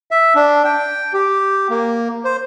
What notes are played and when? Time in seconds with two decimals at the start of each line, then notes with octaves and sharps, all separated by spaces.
0.11 E5
0.35 D4
0.64 G5
1.13 G4
1.70 A#3
2.24 C5